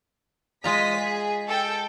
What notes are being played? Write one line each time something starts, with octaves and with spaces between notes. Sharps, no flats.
G#3 F4 D#5 A#5 B6
G#4
A4 G5